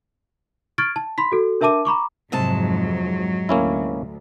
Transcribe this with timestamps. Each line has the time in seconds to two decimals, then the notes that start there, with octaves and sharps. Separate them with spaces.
0.78 C#6 F6 G#6 A6 D7
0.96 A5
1.18 B5 C6 B6
1.32 F#4 A4
1.61 D4 A#4 E5 A5 D6 D#7
1.85 A#5 B5 C#6 D6
2.32 F2 G#2 C3 F#3 G#3 A5
3.49 D2 A#3 C#4 E4